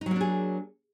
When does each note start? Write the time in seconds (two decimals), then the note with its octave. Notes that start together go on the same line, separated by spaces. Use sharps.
0.01 D#4
0.06 F#3
0.11 A#3
0.16 D4
0.21 G#4